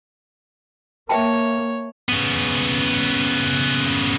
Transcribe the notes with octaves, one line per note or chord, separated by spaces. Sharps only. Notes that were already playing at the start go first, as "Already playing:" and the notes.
A#3 C#5 E5 G5 A5
C#3 B3